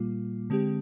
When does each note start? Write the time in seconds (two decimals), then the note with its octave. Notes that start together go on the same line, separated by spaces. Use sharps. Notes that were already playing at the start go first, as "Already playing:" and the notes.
Already playing: A#2 G3 A#3 F4
0.50 D3 G#3 C4 G4